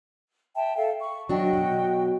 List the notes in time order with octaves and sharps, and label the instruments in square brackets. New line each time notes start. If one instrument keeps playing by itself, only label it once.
[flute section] E5 G5 A5
A4 E5 F5
C#6
[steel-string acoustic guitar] F#3 D4 [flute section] F#4 D#5 G5
[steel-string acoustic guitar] B2 F#3